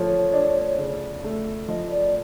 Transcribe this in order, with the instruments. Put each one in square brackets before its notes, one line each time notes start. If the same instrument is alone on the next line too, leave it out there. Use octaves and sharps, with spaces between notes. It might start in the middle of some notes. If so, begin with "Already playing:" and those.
Already playing: [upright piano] F3 A3 [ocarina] C#5
[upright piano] D4
C#3
A3
[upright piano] F3 [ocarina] D#5
[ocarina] D5